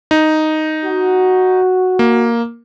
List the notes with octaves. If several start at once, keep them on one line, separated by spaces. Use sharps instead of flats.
D#4
F#4
A#3